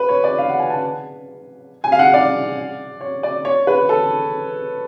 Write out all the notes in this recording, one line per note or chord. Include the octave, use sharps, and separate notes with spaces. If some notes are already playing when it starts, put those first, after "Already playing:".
Already playing: B4
C#5
D5
F5
F#5
G#5
A5
G#5
F5
F#5
D5
C#5
D5
C#5
B4
A4